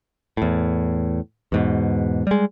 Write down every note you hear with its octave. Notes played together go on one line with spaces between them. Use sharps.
E2 A2
E2 G#2 B2
G3 G#3